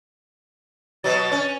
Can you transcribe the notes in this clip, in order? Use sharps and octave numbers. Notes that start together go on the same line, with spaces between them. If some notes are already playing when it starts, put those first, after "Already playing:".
B2 F#3 A6
C#4